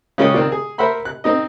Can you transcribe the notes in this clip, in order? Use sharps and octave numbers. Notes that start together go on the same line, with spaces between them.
C#3 G#3 C#4 F4 G5 D#6
D#3 C4 F4 D5
G#4
A#4 C5 E5 F#5 B5 C6
F#6
C4 D#4 D#5